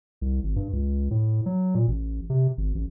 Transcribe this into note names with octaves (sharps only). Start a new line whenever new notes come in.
C2
G#1
G2
C#2
A2
F#3
A#2
A1
C3
G#1
A1